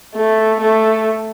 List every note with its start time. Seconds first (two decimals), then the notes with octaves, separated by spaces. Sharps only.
0.16 A3
0.61 A3